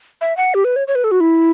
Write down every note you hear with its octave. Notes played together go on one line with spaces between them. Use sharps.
E5
F#5
G4
B4
C#5
C#5
B4
A4
F#4
E4